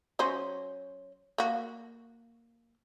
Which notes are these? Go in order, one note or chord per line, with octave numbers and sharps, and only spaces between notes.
F#3 C#4 C5
A#3 F#4